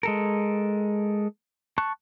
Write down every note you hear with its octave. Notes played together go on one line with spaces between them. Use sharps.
G#3 A4 A#4
A5 C#6 F#6